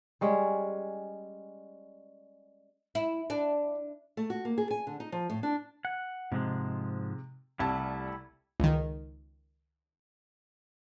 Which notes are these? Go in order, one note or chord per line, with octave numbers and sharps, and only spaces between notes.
G3 G#3 C#4
E4
D4
A3
F#4
A#3
G#4
G#5
D3
D#4
F3
A2
D4
F#5
G#2 C3 F3 G#3
C2 G3 A3 E4 A5
C#2 D#3